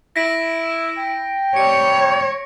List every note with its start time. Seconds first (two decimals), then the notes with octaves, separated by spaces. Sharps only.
0.16 E4 A#6 B6 D7
0.97 G5
1.56 C3 G3 C#5 C#7